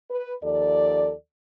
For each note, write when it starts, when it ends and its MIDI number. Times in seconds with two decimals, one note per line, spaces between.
0.10 0.33 71
0.43 1.12 39
0.43 1.12 53
0.43 1.12 69
0.43 1.12 74